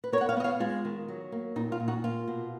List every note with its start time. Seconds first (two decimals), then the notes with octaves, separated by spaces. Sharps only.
0.04 B4
0.12 B3 A#4 C#5
0.21 F#5
0.29 C#5 F5
0.37 B3 D#5
0.44 C#5 F5
0.60 G#3 F4 G#4
0.85 D#3
1.08 F#3
1.32 A#3
1.56 A#2 D#4
1.72 F4
1.80 A#2
1.88 D#4 F#4
2.04 A#3 F4
2.28 B2